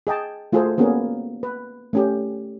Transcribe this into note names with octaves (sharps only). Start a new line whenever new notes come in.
G#4 D#5 G5 A5
A3 F4 F#4 G#4 A4 C5
A#3 B3 C#4 F#4 G#4 A#4
B4
A3 C#4 G4